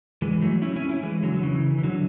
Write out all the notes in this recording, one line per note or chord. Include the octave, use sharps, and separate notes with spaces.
E3 G#3
F#3 A3
C#4 E4
C#4 E4
C#4 E4
E3 G#3
D3 F#3
D3
C#3 E3
E3
D3 F#3